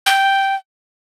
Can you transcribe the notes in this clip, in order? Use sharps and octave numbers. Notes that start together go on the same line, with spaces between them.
G5